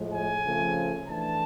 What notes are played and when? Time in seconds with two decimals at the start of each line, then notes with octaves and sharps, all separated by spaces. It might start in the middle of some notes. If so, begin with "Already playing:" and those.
Already playing: A2 F3 G#3
0.11 G#5
0.44 C#3 F3 A3 C4
1.08 E3 A3 D4 A5